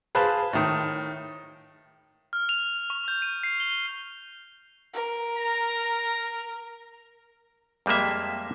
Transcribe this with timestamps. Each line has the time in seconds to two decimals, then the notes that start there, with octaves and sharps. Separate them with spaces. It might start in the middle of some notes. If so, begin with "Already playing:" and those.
0.15 G#4 B4 C5 F5 A5
0.53 A2 D#3
2.33 F6
2.49 F7
2.90 C#6
3.08 G6
3.22 D#7
3.43 C7
3.60 G7
4.94 A#4
5.37 A#5
7.86 F2 G3 G#3 A#3 E5